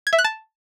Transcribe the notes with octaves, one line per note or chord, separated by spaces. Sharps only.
G#6
E5
F#6
A5